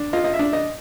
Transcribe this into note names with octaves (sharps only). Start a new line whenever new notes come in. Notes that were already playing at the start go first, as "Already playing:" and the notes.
Already playing: D4
F4 D#5
D#5
E5
D4
D#5